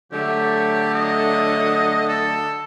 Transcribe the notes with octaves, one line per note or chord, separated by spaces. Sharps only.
D3 F#3 A3 G4
D#5
A4